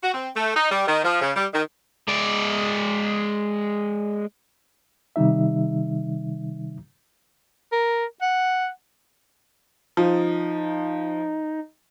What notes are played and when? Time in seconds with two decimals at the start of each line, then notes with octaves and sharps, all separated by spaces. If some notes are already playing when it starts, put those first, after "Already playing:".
0.02 F#4
0.14 C4
0.35 A3
0.56 D#4
0.71 G3
0.88 D#3
1.04 F3
1.22 C#3
1.36 G3
1.53 D#3
2.08 G#3 D5
5.16 C3 D#3 G3 D#4 E5
7.72 A#4
8.21 F#5
9.97 F3 D#4